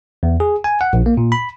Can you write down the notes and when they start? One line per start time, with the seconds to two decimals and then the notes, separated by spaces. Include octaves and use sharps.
0.23 E2
0.40 G#4
0.64 G#5
0.81 F#5
0.93 A#1
1.06 A#3
1.17 A#2
1.32 B5